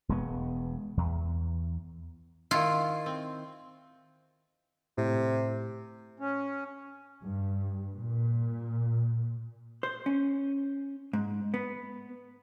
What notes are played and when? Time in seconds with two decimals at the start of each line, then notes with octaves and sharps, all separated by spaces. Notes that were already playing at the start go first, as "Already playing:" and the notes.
0.09 E1 G#3 B3
0.97 E2
2.51 D#3 E4 F4
3.06 C4
4.98 A2 C3
6.20 C#4
7.22 G2
7.96 A#2
9.83 C5
10.06 C#4
11.13 G#2
11.54 B3